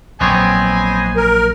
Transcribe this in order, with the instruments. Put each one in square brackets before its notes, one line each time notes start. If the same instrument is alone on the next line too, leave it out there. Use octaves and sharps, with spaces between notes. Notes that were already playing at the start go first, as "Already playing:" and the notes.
[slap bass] A#1 F#3 [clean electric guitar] B3 C4 C#5 [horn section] C5 D#5 G#5
[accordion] A#4